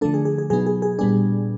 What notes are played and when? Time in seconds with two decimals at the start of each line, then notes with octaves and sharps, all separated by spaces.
0.01 D3 F3 A3 D4 A4
0.14 G#4
0.25 G#4
0.38 G#4
0.50 B2 F#3 B3 D#4 G#4
0.66 G#4
0.82 G#4
0.99 A#2 G3 B3 D4 G#4